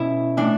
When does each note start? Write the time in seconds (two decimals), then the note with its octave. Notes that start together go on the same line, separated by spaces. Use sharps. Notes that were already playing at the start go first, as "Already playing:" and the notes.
Already playing: B2 C#4 E4
0.37 A2 E3 D4